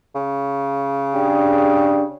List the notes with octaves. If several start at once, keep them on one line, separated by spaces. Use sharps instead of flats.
C#3
D4 G4 G#4